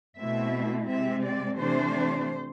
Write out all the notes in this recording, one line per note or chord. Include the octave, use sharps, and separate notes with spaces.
B2 A3 C4 E4 E5
C3 G#3 C4 E5
D5
C3 E3 A3 D4 C5